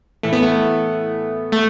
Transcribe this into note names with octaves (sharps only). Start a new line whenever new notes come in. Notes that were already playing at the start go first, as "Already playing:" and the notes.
A2 E3 A3
B3
A3
A3